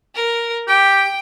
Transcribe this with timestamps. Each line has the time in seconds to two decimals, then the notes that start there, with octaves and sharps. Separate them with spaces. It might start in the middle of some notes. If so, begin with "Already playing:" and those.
0.15 A#4
0.68 G4 G5